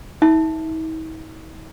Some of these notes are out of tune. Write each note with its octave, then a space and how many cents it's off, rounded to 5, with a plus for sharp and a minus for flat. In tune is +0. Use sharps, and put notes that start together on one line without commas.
D#4 +45 E5 +0